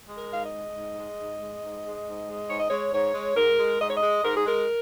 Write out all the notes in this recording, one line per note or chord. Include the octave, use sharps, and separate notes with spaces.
G#3
A#4
G#2 F5
D#5
G#3
G#2
G#3
G#2
G#3
G#2
G#3
G#2
G#3
G#2 C#5
D#5
G#3 C#5
G#2 C#5
G#3
G#2 A#4
G#3
G#2 D#5
C#5
D#5
G#3
G#2 A#4
G#4
G#3 A#4